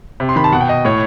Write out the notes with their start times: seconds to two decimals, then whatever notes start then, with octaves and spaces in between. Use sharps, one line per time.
0.20 C3
0.29 C6
0.36 D#3 B5
0.44 A5
0.52 B2 F#5
0.61 G5
0.69 D#5
0.85 A2 C#5